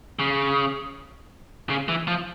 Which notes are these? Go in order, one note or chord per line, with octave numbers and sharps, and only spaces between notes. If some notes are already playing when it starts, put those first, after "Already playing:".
C#3
C#3
E3
F3